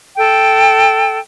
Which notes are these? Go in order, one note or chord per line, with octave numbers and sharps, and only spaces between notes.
A4 G5